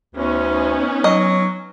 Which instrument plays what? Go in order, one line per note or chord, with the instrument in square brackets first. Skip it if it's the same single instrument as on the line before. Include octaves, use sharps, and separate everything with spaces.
[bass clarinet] D2 [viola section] B3 C#4 D#4
[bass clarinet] F#3 [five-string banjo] D#5